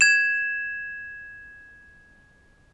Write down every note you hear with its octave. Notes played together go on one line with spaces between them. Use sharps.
G#6 E7